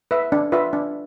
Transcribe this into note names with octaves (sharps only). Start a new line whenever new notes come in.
B4 E5
D4
F4 B4 E5
D4